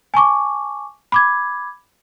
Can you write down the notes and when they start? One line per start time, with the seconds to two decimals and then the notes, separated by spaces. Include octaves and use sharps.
0.14 G#5 A5 C#6 D6
1.12 B5 D6 G#6